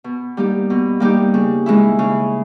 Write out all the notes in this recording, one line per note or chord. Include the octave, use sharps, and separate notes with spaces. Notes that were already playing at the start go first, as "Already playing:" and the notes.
B2
G3 A#3 D#4 G4
B2
G3 A#3 D#4 G4
C#3
E3 G#3 C#4 E4
C#3